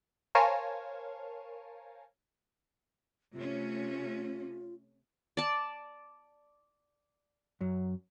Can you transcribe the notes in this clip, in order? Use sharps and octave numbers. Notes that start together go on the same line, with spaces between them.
A#4 C5 C#5 F5 G#5 A5
C3 A3 C#4 F4
D5 A5
F#2 F#3